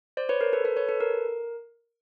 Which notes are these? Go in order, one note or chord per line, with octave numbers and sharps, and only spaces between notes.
C5 D5
B4 C#5
A#4 C5
A4 B4
A4 B4
B4 C#5
A4 B4
A#4